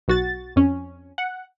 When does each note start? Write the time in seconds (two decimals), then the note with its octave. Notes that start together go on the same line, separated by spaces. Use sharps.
0.08 B1 F#4 A6
0.56 F2 C#4
1.18 F#5